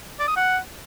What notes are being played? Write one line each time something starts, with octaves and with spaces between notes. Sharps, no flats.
D5
D#6
F#5